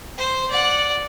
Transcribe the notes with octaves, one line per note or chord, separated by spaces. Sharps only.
C5
D5 F#5